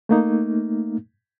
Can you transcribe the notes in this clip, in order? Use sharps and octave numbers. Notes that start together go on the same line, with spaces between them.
A3 A#3 D#4